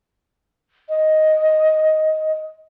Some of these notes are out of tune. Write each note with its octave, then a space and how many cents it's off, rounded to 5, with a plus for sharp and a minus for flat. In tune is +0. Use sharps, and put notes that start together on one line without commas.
D#5 +5